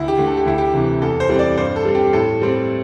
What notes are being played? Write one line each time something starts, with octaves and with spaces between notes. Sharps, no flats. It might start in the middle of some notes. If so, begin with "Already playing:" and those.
Already playing: D2 E4
G4
D3 A3
A4
G4
D2 E4
G4
C3 E3
E2 A4
C5
E3 G3 C4
D5
G2 C5
A4
G3 C4
G4
A2 A4
G3 C4